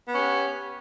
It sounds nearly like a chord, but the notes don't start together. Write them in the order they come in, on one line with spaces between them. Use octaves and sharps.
B3 C#4 G4